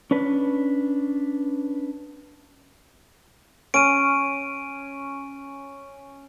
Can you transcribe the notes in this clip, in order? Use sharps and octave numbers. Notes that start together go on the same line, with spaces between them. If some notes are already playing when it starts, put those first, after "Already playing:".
C#4 D4 B4
C#4 D7 D#7